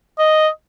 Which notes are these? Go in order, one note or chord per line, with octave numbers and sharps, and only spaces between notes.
D#5